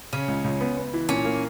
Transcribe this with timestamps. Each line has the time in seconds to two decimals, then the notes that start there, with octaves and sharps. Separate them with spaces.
0.13 C#3 C#4
0.28 C#2
0.44 C#2
0.61 B3
0.77 B3
0.94 E3
1.09 A#2 C#4
1.25 A#3